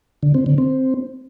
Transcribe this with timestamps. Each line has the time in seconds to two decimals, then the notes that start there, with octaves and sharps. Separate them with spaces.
0.23 D3
0.34 C4
0.46 D3
0.58 C4